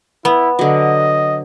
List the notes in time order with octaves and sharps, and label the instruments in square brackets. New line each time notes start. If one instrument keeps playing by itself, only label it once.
[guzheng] B3 [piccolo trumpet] E4
[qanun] D3 F#3 [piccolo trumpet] D#5